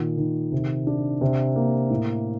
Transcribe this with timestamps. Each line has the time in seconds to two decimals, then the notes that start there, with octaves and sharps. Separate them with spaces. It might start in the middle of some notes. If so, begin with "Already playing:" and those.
Already playing: A#2 D#3
0.17 D#3
0.52 C3
0.87 D4
1.21 C3
1.56 A#3
1.90 A2